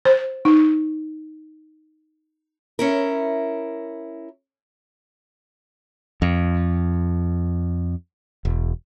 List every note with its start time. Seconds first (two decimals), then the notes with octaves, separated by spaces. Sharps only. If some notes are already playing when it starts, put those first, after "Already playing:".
0.05 C5
0.45 D#4
2.79 C#4 E4 A#4
6.22 F2
8.45 E1